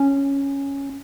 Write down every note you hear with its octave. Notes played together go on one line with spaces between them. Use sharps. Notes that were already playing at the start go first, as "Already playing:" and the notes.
Already playing: C#4